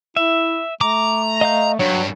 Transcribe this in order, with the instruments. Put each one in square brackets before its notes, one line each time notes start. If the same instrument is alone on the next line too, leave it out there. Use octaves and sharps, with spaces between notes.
[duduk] E4 [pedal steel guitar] E5
[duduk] A3 [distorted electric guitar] A#5 [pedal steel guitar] D6
[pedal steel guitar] D#5 F5 G6
[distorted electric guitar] G2 [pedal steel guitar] F#3 [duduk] C#5